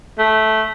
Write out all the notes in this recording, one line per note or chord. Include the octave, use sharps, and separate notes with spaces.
A3